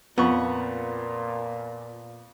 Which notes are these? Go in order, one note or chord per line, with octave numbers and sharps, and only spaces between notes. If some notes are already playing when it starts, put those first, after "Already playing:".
F2 A#2 B3 C#6